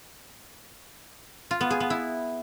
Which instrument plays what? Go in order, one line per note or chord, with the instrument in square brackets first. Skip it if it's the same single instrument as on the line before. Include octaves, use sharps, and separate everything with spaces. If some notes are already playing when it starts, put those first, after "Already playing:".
[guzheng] F4
B3
G#4
B3
E4